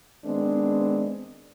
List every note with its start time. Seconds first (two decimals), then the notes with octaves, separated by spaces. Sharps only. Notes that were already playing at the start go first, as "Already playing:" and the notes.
0.24 D#3 G#3 B3 C4 D4